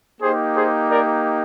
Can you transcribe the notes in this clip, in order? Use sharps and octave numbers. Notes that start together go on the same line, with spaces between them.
A#3 D#4 G4 G#4 C5
G#4 C5
A#4 D5